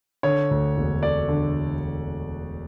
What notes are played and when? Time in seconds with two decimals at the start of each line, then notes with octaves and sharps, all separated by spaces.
0.23 D3 C#5
0.51 D2
0.77 E1
1.02 A3 D5
1.28 D3